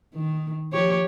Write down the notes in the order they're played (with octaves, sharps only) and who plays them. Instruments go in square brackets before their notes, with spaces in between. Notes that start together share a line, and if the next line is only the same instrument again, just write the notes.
[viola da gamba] D#3
F3 G4 C#5